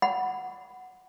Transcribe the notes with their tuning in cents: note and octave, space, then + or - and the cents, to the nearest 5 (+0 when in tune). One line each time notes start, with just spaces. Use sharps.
F#5 +0 B5 +20